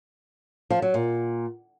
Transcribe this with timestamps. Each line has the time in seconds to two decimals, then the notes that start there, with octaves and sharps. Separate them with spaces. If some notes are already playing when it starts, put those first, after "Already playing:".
0.70 F3
0.82 F#3
0.94 A#2